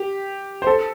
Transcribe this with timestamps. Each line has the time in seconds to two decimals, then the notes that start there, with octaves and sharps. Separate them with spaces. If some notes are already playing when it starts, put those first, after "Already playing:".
Already playing: G4
0.62 C5
0.67 A4